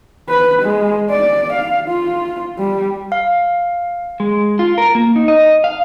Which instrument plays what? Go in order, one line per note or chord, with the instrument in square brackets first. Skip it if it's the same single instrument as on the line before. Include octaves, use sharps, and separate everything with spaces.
[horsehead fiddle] B4
G#3
D5
F5
F4
G3
[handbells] F5
[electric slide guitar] G#3
F4
A#4
A#3
D#4
D#5
F5